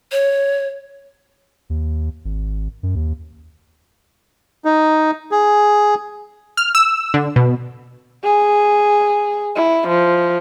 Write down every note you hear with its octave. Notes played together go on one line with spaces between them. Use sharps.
C#5
D#2
G#1
F#2
D#2
D#4
G#4
F6
E6
D3
B2
G#4
E4
F3